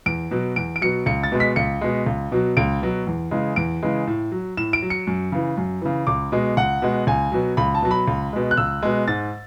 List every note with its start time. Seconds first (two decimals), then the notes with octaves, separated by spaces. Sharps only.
0.06 E2 D7
0.31 B2 F#3
0.56 E2 D7
0.76 D7
0.81 B2 F#3 C#7
1.06 C#2 C#7
1.23 A6
1.32 B2 G#3
1.40 B6
1.56 C#2 C#7
1.81 B2 G#3
2.06 C#2
2.32 B2 F#3
2.57 C#2 D7
2.82 B2 F#3
3.07 E2
3.31 C#3 E3 G#3
3.56 E2 D7
3.83 C#3 E3 G#3
4.07 A2
4.32 F#3
4.57 A2 E7
4.73 D7
4.82 F#3
4.90 C#7
5.07 F#2
5.32 C#3 E3
5.57 F#2
5.82 C#3 E3
6.07 C#2 D6
6.32 B2 G#3
6.57 C#2 F#5
6.82 B2 G#3
7.07 C#2 G#5
7.32 B2 F#3
7.57 C#2 B5
7.75 A5
7.82 B2 F#3
7.91 B5
8.08 C#2
8.33 B2 G#3
8.51 F#6
8.57 C#2 E6
8.83 B2 G#3
9.08 G#2 A6